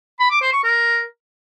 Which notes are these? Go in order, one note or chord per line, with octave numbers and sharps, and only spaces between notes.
B5
D6
C5
C#6
A#4